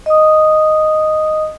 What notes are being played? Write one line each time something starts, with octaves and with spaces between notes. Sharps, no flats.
D#5 D#6